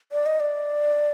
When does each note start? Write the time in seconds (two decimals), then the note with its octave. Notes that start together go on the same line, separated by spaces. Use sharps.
0.12 D5
0.26 D#5
0.40 D5